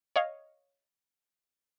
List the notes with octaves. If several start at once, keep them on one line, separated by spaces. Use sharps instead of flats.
C#5 D#5 F5